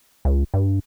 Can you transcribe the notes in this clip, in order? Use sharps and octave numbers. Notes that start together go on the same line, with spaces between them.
C#2
G2